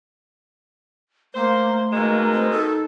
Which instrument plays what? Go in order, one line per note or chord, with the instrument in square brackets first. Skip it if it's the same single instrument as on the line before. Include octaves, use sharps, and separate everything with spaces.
[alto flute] A3 [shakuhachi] A#3 [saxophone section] C5
[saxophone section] B2 D#3 G#3 [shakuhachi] A#3
[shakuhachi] C4
[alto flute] D#4 [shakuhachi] A4